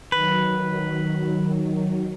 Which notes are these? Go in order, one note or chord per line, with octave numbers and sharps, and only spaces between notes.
D#3 F#3 B4